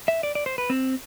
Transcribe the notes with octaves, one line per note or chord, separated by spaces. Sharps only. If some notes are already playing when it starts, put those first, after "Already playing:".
E5
D5
D5
C5
B4
C4